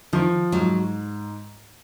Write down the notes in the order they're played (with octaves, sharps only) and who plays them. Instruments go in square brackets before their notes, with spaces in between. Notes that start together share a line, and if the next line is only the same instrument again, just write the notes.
[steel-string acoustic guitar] D#3 [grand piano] F3
[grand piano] G#2 [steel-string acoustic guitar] F#3